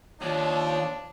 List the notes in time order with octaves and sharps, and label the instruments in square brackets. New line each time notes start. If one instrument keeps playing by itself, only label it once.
[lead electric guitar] D#2 [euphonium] F3 [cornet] D4 [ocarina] C#5